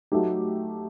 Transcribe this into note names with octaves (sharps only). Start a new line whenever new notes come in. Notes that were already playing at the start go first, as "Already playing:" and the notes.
F#3 A3 D#4 G4